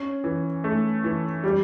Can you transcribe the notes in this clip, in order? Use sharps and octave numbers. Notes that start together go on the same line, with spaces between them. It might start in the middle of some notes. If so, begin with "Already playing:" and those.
Already playing: C#4
E3
A3
E3
G3